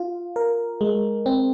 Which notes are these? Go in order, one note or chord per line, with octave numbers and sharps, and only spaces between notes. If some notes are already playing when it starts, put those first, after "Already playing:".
Already playing: F4
A#4
G#3
C4